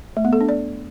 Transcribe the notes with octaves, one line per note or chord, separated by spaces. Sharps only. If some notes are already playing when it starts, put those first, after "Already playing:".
A3
B3
A4
D4
D5